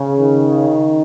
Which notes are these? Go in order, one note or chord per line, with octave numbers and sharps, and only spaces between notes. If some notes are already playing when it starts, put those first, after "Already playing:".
Already playing: C#3
D#3